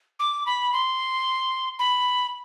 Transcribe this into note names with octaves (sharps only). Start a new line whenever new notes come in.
D6
B5
C6
B5